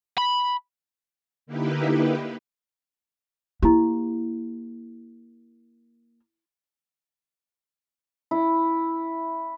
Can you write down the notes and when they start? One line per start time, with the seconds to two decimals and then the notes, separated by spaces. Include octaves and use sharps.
0.18 B5
1.46 D3 A#3 D#4 E4 G4 B4
3.62 A#3 E4 G4
8.31 E4